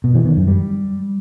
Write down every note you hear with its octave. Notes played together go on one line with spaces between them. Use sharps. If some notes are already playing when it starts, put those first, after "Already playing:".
B2
E3
D#3
F#2
G3